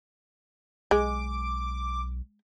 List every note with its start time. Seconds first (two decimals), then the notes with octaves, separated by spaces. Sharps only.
0.91 B1 G#3 D6